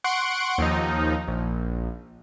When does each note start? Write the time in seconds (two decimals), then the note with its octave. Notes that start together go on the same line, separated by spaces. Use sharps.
0.04 F#5 C6 C#6 D7
0.58 D#2 F3 D#4
1.28 A#1